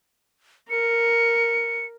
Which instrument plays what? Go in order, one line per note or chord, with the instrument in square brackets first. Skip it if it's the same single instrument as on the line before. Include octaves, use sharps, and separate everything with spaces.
[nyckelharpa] A#4 [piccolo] C#7